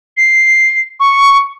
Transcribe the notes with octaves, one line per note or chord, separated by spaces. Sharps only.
C7
C#6